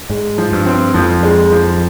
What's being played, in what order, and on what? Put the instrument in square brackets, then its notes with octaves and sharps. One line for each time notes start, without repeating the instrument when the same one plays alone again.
[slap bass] G#2 [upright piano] G#3
[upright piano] F3
[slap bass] G2
[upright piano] C4
[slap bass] F2 [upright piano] F3
[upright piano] G#3
F3